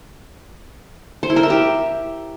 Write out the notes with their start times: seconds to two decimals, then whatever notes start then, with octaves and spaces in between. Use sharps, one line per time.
1.23 C5
1.30 E4
1.36 A#4
1.43 E5
1.50 G4